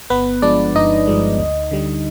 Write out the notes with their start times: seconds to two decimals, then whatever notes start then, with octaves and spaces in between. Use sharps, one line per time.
0.10 G1 B3 B4
0.42 G2 F3 G#3 D4 D5
0.75 G1 D#4 D#5
1.07 G2 F3 G#3
1.39 D2
1.71 D3 G3